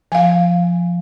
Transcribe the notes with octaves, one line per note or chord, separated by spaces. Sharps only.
F3 F5 G#5